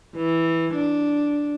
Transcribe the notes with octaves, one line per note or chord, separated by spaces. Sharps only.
E3
D4